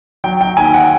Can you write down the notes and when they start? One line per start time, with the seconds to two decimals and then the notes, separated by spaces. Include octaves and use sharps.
0.24 F#3 G5
0.41 G5
0.57 D#2 G#5
0.74 F#5